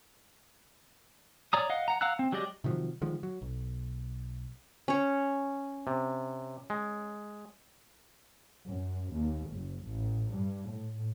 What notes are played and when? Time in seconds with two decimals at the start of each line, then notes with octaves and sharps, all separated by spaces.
1.53 C#5 D5 A#5 D#6
1.70 D#5 F5 F#5
1.88 F#5 A#5
2.01 F5 F#5 A#5 E6 F#6
2.19 C4
2.32 F#3 G#3 G4 D5 D#5
2.64 C3 D#3 F3 F#3
3.01 D3 D#3 F3 G#3
3.23 F#3
3.42 B1
4.88 C#4 C#5
5.87 C3
6.70 G#3
8.66 F#2
9.13 D#2
9.49 F#1
9.87 A1
10.31 G2
10.69 A2